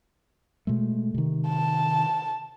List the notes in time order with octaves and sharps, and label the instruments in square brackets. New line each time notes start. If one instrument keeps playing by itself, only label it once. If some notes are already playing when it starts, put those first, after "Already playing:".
[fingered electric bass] B2 G#3 A3
C3 D#3
[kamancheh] A5